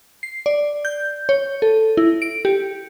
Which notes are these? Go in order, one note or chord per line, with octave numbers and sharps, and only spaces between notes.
C7
D5
G6
C#5
A4
E4
D7
G4